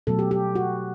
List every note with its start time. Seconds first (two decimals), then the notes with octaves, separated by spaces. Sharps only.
0.07 B2 F#3 A3 A4
0.19 G4
0.31 G4
0.55 F#4